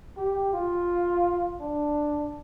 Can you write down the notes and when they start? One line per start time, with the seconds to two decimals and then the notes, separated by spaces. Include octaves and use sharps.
0.17 G4
0.53 F4
1.60 D4